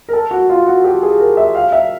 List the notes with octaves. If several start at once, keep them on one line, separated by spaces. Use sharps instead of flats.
A#4
A4
F#4
F4
F#4
G4
G#4
A#4
E5
F5
E5